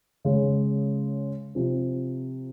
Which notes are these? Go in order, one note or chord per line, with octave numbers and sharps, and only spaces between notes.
C#3 G#3 C#4
C3 F3 C4